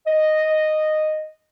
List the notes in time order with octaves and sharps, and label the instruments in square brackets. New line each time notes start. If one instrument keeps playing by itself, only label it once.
[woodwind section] D#5